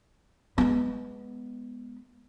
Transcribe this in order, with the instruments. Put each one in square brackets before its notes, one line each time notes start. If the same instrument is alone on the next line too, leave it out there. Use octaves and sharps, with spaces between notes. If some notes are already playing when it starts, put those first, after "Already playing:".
[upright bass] G#3 B3